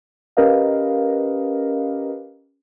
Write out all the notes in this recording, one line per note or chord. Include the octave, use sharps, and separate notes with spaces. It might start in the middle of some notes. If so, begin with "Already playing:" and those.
C#4 G4 A#4 B4 D#5 F5